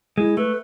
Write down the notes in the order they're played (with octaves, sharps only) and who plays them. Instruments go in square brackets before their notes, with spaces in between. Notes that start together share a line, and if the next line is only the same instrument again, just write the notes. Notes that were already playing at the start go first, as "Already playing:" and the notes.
[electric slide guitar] G#3 [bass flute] E4
[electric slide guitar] A3 [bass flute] B4